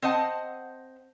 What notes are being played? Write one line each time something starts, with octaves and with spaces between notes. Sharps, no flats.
C4 C5 D#5 F#5 A5